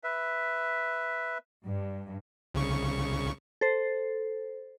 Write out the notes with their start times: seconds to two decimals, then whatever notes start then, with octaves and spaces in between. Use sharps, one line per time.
0.04 B4 E5
1.66 G2
2.54 C2 C#3 C#6
3.61 A4 C5